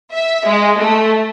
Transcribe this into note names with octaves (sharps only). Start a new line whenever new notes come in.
E5
G#3
A3